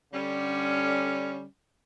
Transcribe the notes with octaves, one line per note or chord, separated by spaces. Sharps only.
D3 G3 C#4